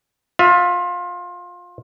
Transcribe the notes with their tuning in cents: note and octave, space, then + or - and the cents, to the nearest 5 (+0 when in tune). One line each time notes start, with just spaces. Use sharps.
F4 +25 E5 +0